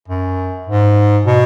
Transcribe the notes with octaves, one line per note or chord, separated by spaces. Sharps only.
F#2
G#2
B2